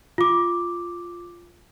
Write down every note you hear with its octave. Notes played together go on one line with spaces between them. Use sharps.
F4 D6